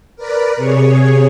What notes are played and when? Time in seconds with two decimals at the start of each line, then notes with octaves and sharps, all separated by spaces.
0.16 A#4 B4 D5
0.57 C3 G#4 C#5